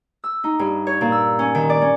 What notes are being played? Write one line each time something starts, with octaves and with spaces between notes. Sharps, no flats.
E6
D#4
G2
C#5
A#2
E6
C#4
D#3
D5
C#4